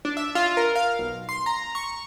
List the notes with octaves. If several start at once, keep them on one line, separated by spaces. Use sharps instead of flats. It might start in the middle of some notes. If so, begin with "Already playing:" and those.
D4
E5
F4
A#4
F5
B1
C6
A#5
C#6